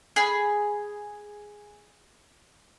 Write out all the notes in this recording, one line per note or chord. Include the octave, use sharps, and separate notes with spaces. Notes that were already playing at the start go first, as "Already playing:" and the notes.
G#4 B5